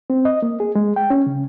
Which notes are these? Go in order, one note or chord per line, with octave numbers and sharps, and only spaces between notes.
C4
D#5
A#3
G#4
G#3
G5
C#4
C#3